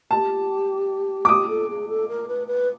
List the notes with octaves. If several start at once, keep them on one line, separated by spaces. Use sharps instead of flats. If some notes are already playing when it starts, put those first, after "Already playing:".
G4 A5
D6
G4 D#6
A4
G#4
A4
A#4
B4
B4